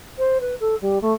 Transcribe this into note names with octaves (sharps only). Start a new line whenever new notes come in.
C5
B4
A4
G3
A3